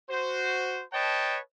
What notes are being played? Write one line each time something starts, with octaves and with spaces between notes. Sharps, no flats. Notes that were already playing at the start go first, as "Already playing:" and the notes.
F#4 C5
B4 C#5 D#5 G5 A5